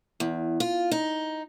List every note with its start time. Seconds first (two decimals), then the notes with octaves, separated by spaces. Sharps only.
0.20 E2
0.60 F4
0.91 D#4